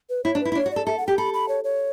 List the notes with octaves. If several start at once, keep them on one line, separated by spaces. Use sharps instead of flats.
B4
E4 C#5
D4
E4 B4
E4
D4 C#5
F#4
A4 D5
A4 E5
F#5
G4 G5
A4 B5
B5
C#5
C#5